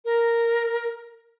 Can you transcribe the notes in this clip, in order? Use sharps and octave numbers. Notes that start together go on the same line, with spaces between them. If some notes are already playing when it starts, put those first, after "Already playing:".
A#4